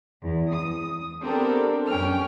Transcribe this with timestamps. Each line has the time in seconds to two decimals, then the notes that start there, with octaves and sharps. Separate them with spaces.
0.22 E2
0.54 D#6
1.23 B3 C4 D4 G4 A4 A#4
1.89 F#2 C#4 G5 F6